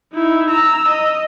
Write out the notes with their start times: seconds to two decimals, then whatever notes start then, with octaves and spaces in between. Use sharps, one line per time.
0.13 D#4 E4
0.50 A#5 E6
0.89 D#5